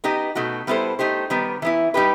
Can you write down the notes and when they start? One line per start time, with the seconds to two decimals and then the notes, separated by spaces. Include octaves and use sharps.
0.04 B3 D#4 G4 D#5
0.35 B2 A3 D#4 F#4
0.67 G3 B3 E4 A4 C5
0.99 A3 D#4 G4 C5
1.30 D#3 G3 B3
1.62 E3 B3 E4
1.94 G3 D#4 G4 B4